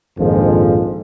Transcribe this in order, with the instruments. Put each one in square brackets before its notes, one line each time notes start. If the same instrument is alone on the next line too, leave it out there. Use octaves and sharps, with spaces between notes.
[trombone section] A#1 F2 G#2 D#3 F3